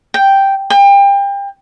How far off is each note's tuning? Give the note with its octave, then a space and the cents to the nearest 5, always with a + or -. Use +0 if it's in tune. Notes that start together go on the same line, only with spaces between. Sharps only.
G5 +0
G5 +30